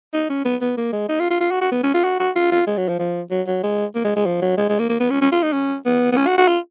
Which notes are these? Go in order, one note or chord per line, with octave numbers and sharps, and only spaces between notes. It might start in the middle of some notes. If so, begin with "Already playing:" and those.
D#4
C#4
B3
B3
A#3
G#3
D#4
F4
F4
F4
F#4
F#4
B3
C#4
F4
F#4
F#4
F4
F4
G#3
F#3
F3
F3
F#3
F#3
G#3
A#3
G#3
G#3
F3
F#3
G#3
G#3
A#3
A#3
B3
C#4
C#4
F4
D#4
C#4
B3
B3
C#4
F#4
F#4
F4